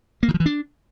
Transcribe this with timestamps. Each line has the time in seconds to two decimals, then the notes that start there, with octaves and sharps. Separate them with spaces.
0.23 A#3
0.28 D#3
0.34 F3
0.40 E3
0.46 D4